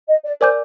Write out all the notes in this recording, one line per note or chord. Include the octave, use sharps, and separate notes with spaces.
D#5
D5
A#4 C5 D5 G#5 D6 G6